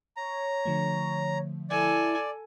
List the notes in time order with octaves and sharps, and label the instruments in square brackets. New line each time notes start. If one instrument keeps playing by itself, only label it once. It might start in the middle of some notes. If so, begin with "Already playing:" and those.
[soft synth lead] C#5 [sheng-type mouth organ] A#5
[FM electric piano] D3 F3 A3
[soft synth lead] E4 [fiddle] A4 G#5 [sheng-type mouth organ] D5